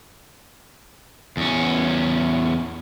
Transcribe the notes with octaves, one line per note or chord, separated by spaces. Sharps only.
E2 C#4